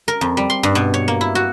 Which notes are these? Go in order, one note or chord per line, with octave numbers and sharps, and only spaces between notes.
A#4
F2
G3
C6
G2
B2
C#5
A#3
E4
F#4